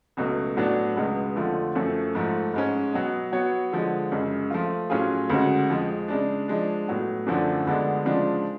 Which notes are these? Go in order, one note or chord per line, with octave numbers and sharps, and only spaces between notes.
C#2 B2 F#3 A3
A2 F#3 B3 D4
C#2 B2 G#3 B3
F2 D3 F3 A3 F4
F#2 F3 A3
G#2 F3 A3
G#2 G#3 C#4
B2 F#3 B3
F#3 B3 F#4 C#5
D3 F3 G#3
F#2 C#3 G#3
F3 A3 F4
A2 F#3 C#4 F4 G#4
D2 C#3 G#3 C#4 F#4
F2 F3 G#3
C#3 G#3 D4
F3 G#3 D4
A2 F#3 B3
F#2 D3 F3 A3 D4
D2 D3 G#3 B3 D4
C#3 F3 G#3 D4 F4